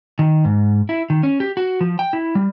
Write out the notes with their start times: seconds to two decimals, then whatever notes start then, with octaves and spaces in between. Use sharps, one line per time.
0.19 D#3
0.45 G#2
0.89 E4
1.10 D#3
1.23 C#4
1.40 G4
1.57 F#4
1.81 F3
1.99 G5
2.13 E4
2.35 G3